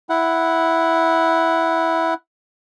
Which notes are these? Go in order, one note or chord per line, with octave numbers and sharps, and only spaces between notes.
E4 F#5